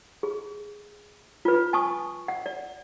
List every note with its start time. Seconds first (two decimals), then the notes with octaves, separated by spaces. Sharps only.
0.23 G#4
1.45 F4 B4
1.73 G#5 A5 C#6 D#6
2.28 F#5
2.46 D5